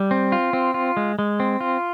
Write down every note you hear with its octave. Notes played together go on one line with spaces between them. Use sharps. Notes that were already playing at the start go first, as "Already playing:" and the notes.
Already playing: G3
C4
F4
C4
F4
G#3
G#3
C4
F4